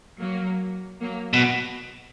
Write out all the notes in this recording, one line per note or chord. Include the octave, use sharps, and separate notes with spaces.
F#3 A#3
F#3 A#3
B2